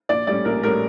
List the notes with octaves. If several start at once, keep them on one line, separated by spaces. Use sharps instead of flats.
A#1 D5
A2 G3 C#4 D5
A#1 A#4
A2 G3 C#4 A#4